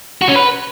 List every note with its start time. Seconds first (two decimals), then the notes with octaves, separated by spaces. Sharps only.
0.22 F#4
0.29 C#4
0.36 B4